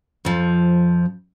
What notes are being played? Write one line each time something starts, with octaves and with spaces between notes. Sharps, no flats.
F2 F3